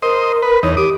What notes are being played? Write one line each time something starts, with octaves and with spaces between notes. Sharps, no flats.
A#4 C5 D#5
B4
E2 D#4 C#5
G4 D6 D#6